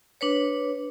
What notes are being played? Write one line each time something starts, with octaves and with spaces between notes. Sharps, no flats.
D4 B4 C#5